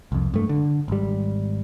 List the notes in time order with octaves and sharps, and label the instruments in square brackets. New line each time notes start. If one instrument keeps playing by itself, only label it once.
[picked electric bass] C2 F2
G2 A3
D3
G#1 G3